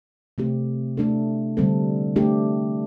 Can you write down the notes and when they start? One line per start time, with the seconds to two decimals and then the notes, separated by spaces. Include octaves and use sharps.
0.38 C3 A3 C4 G4
0.97 A3 D4 A4
1.57 D3 G3 C4 A4
2.16 A3 D4 G4